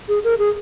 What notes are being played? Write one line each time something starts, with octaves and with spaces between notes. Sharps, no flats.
G#4
A#4
G#4